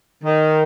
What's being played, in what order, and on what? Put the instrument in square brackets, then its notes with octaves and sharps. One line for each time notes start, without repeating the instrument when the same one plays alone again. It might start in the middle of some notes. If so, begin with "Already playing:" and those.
[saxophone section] D#3